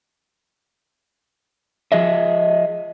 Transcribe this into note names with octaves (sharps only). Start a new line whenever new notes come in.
F3 G#4 D#5 E5